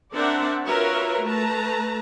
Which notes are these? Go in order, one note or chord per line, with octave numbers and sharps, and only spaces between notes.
C4 D4 A#4 D5 E5 F#5
F4 F#4 A#4 B4 C#5 E5
A3 B4 A5 A#5